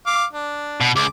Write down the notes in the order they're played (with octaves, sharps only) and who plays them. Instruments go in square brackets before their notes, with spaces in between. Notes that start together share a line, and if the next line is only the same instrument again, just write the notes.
[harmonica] F5 D6
D4
[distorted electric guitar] B2
[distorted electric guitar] C#2 [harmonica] D6